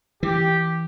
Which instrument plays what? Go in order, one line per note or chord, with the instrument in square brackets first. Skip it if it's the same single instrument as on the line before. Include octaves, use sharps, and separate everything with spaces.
[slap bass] E3 [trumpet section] G4